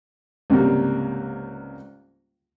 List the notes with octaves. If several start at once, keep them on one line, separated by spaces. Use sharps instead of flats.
C#2 G#2 C3 G3 A#3